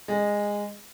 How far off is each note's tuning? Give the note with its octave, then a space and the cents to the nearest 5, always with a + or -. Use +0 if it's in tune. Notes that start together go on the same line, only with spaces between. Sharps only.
G#3 -15